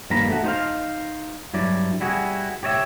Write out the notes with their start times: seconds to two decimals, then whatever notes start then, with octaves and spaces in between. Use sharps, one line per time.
0.10 G2 D#3 F3 A#3 A#5 B5
0.29 A3 F#4
0.44 D#4 C5 F5
1.54 G2 F#3 E4 D5
2.00 G3 E4 F#4 G#4
2.63 G4 C#5 D5 E5